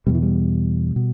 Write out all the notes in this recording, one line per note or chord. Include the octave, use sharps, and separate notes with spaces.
E2 B2 G3
E3
G3
B2